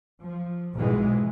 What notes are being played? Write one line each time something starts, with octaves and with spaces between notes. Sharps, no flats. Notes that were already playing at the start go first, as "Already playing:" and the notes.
F3
B1 G#2 B2 E3 F3 G#3